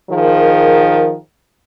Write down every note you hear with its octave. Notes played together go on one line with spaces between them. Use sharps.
D#3 F3 G#4 A#4